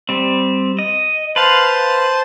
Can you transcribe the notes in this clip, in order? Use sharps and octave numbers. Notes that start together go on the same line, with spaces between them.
G3 C4
D#5
B4 C5 F5 A5 C6